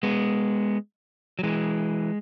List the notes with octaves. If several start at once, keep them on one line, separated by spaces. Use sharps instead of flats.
G#3 B3
F#3
E3 G#3